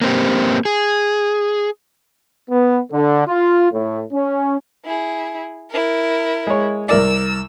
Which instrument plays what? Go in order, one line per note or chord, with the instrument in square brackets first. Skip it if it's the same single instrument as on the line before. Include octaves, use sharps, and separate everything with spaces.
[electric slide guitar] A#3 C4 G4
G#4
[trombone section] B3
D3
F4
A2
C#4
[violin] E4 G#4
E4 A#4
[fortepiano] G#3 C#5
[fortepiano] C2 A#4 D5 [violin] E6